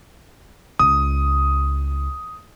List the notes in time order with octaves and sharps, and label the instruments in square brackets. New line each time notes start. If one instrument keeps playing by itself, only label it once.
[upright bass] C#2 [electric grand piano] D#6